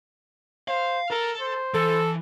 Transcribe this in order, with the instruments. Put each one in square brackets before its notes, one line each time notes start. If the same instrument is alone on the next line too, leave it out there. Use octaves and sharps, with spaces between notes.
[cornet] C5 [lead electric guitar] F5
[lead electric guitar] A4 [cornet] A#4
[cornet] C5
[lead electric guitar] E3 [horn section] A4